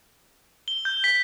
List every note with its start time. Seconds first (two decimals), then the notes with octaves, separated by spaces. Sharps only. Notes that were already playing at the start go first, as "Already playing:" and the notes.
0.68 G7
0.85 G6
1.04 B6